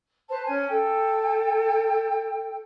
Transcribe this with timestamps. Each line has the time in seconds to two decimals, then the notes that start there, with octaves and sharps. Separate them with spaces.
0.29 B4 C5 A5
0.47 C#4 G#5
0.69 A4 G5